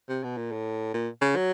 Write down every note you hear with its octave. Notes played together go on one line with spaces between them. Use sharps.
C3
B2
A#2
A2
A#2
C#3
F#3